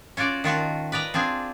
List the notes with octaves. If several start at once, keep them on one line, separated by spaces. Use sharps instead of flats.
C#4 F4 F#4 D5
D#3 F4 F#4 A5
B4 D5 D#5 A#5
C4 D4 F4 G#4